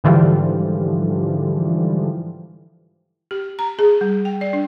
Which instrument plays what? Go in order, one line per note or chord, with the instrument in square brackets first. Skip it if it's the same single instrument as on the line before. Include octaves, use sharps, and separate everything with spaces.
[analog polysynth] G#2 D3 E3 F3 G3
[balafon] G4
A#5
G#4
G3
G5
D5
D4